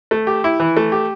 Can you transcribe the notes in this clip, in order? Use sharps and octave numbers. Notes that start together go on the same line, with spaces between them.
A3
G4
E4
E3
A3
G4